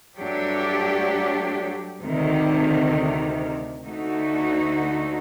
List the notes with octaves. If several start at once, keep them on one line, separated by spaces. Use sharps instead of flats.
G2 F#3 A3 D4 G4
D2 C3 D#3
D2 D3 A3 D#4 F#4